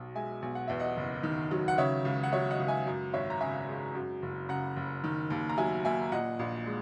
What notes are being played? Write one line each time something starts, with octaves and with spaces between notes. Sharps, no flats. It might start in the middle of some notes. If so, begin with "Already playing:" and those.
Already playing: B1 B2
G#3 E5 G#5
B1 G#5
F#5
E2 E5
D#5 F#5
F#1
D#3
F#3
F#5
C#3 C#5 E5
C#2
F#5
F#3 C#5 E5
D#5 F#5
C#2
E5 G#5
F#2
G#1 C#5 E5
A#5
C#3 E5 G#5
G#3
F#2
F#1
C#3 F#5 A#5
F#1
D#3
D#2
A#5
F#3 E5 G#5
D#2 E5 G#5
A#2 D#5 F#5
A#1
G#3